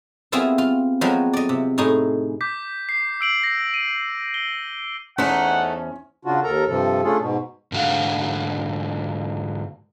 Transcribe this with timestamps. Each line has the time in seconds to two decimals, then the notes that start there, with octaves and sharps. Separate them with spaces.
0.32 G3 B3 C4 E4 F4 G#4
0.58 F4
1.01 F3 F#3 G#3 B3 C4
1.33 D5 D#5
1.49 C3
1.78 A2 G#3 D#4 G#4
2.41 D6 G6 B6
2.89 C7
3.21 E6 D7 F#7
3.44 A#6
3.74 D#7
4.34 G7
5.18 E2 A3 C#4 D#4 C5 F#5
6.25 C#3 D4 F4 F#4
6.44 D#2 A4 A#4 A#5
6.67 G2 C3 F3 A4
7.03 A3 C#4 D4 F4 G#4 A4
7.20 G#2 B2
7.72 G#2 D3 F#4 F5